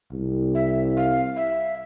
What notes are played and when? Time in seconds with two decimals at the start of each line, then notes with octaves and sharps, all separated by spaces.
0.12 C2
0.55 E5
0.97 F5
1.36 E5